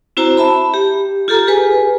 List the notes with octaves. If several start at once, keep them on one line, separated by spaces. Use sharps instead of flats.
C4 E4 F#4 C5 A#5
E5 A5 B5
G4
F4 G4 A4 A#5
G4 G#4 B4 G#5